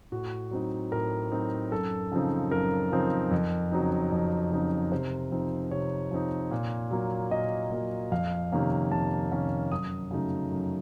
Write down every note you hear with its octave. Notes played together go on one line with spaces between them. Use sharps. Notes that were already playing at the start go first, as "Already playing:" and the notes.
A2 F#4
F#3 C4 D#4
A2 A#4
F#3 C4 D#4
F#2 A4
C#3 F3 C4 D#4
F#2 A#4
C#3 F3 C4 D#4
F2
C#3 F#3 C4 D#4
F2
C#3 F#3 C4 D#4
C3 C5
F3 C4 D#4
C3 C#5
F3 C4 D#4
A#2
F#3 A#3
A#2 D#5
F#3 A#3
F2 F5
C3 D#3 A#3 C#4
F2 A5
C3 D#3 A#3 C#4
F#2 D#6
C#3 F#3 A3 D#4
F#2